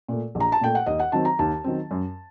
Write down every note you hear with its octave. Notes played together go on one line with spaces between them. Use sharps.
A#2 A3
A#1
A#5
A5
A#2 A3 G5
F#5
D#2 D#5
F#5
D#3 F#3 C4 A5
A#5
D#2 A5
D#3 F#3 C4
F#2